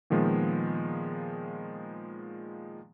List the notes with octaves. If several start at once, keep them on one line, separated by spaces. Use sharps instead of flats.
A#2 D#3 F3 G#3 B3